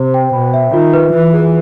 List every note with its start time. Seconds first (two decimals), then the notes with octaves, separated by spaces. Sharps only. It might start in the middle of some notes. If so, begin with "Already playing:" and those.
Already playing: C3 C5
0.14 G5
0.33 B2 B5
0.54 E5
0.73 D#3 F4
0.94 B4
1.13 E3 E5
1.33 G#4